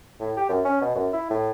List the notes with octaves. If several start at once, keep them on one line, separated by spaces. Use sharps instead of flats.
A2
G4
F#2
C#4
B2
F#2
E4
A2